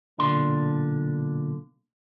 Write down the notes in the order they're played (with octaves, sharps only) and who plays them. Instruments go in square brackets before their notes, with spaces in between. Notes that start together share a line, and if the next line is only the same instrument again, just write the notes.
[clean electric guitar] B1 A#2 D3 D4 C6